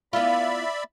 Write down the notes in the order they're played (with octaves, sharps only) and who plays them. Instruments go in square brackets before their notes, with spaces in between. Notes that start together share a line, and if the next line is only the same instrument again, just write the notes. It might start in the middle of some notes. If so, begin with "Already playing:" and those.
[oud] B3 E4 F4 [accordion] D5 E5 B5